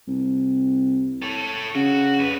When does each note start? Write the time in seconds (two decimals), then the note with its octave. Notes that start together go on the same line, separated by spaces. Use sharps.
0.07 C2
1.22 A4 C#5
1.75 C#3 F#4
2.19 F2 B4